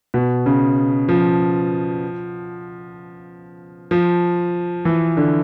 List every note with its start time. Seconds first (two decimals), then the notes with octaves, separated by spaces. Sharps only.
0.14 B2
0.46 C#3
1.09 F3
3.91 F3
4.85 E3
5.17 D3